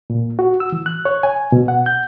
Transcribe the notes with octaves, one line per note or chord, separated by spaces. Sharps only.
A#2
F#4
E6
E3
F#6
C#5
G#5
B2
F#5
G6